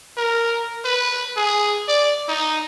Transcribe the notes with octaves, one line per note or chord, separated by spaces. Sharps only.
A#4
B4
G#4
D5
D#4